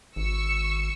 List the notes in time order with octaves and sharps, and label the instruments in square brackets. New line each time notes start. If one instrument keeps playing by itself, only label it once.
[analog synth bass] G#1 [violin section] C#6 E6 C#7